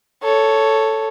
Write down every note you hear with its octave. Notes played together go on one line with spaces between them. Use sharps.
A4 C#5